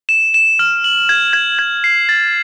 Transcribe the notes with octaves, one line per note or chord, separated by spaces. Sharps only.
E7
E7
F6
F#7
G#6
G#6
G#6
C7
A6